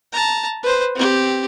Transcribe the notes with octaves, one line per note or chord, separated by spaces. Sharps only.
A5 A#5
B4 C5
C4 G4